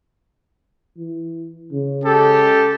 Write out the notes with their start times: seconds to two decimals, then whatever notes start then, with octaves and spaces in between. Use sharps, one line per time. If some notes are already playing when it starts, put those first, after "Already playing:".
0.97 E3
1.73 C#3
2.04 G#3 G4 A4